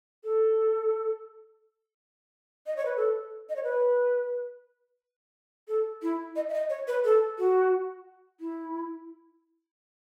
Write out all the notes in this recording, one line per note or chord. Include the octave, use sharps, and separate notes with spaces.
A4
D#5
C#5
B4
A4
D#5
C#5
B4
A4
E4
D#5
E5
D#5
C#5
B4
A4
F#4
E4